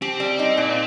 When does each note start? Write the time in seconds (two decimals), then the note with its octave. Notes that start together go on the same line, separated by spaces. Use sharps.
0.02 C4 G4
0.20 G3
0.39 D#4
0.57 A#2